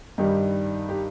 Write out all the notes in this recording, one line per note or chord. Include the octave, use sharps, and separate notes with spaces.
G2 D#3 G3 D#4 G4
G4